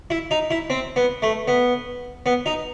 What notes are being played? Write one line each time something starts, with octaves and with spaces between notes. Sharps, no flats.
E4
D#4
E4
C4
B3
A3
B3
B3
D#4